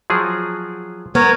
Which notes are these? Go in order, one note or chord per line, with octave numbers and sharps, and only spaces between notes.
F3 F#3 G#4
B3 A#4 C#5